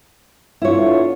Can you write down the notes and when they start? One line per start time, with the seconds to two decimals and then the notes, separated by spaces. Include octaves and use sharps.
0.62 D3 B3 E4 F4 C#5